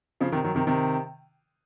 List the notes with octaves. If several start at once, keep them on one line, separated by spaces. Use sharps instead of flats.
C#3 F3
C3 D#3
D#3 F#3
C3 D#3
C3 D#3